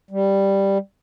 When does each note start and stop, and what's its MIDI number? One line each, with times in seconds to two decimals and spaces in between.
0.11 0.78 55